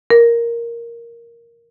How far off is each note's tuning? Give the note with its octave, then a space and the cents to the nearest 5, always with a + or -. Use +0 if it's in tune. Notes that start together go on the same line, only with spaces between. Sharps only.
A#4 +0